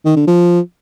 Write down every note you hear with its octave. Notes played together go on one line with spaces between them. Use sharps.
D#3
D3
F3